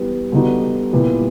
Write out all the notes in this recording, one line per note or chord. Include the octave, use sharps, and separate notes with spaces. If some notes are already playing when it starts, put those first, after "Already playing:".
Already playing: E3 G3 B3
D3 G3 B3 D#4 F#4
A#2 G3 B3 E4 G4